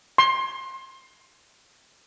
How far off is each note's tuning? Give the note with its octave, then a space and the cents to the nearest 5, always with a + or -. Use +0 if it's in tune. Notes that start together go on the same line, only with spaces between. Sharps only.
C6 +25